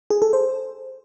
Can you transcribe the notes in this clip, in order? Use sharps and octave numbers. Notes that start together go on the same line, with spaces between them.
G#4
A4
C5